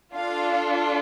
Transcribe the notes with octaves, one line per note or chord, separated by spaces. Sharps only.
D4 F4 A4 F5